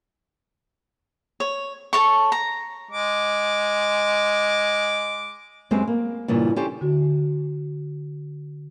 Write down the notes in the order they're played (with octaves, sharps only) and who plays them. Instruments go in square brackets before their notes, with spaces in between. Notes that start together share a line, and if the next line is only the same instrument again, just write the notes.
[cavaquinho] C#5
A4 C#5 C#6
A#5
[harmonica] G#3 D6
[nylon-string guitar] F#2 G#3 C4 G4 B4 C5
A#3
G2 A#2 C#3 E3
C#4 E4 G4 A4 C5
[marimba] D3 F#4